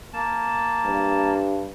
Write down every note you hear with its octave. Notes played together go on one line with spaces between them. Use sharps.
A#3 A5
G2